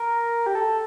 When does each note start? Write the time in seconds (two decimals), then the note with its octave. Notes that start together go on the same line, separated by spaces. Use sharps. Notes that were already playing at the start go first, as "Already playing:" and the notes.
Already playing: A#4
0.46 G4
0.55 A4